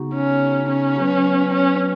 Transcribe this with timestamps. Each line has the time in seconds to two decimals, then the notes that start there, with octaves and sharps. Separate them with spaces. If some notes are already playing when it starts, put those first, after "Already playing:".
Already playing: C#3 B3 D#4 F#4
0.14 C#4
0.69 C#4
0.98 F#3 B3 F#4 B4
1.53 C#4